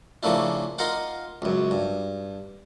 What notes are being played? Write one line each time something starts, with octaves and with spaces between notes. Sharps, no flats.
C#3 F3 A3 A#3 D4 E4
D#4 F4 A#4 F5 F#5 D6
C#2 F#2
G2